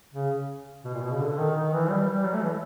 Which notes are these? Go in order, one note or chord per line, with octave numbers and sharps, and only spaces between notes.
C#3
B2
A#2
B2
C#3
D3
D#3
D#3
E3
G3
G3
F#3
A3
E3